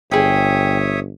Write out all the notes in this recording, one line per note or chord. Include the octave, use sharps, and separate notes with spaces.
G1 G#4 C#5 E5 G5 D#6